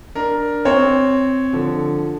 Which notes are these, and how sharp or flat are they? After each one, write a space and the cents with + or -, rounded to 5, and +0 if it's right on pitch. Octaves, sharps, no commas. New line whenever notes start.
D4 +0 A#4 +5
C4 +0 C#5 +0 G5 +30
D3 +5 F3 +0